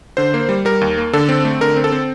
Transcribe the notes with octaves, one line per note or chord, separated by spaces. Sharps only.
D3 C5
A#3
G3
G3 A#4
D#2
A#3
D3 A4
C4
A3
D3 A#4
C4
A4
C4